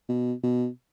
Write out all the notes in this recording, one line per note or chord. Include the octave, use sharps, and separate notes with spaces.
B2
B2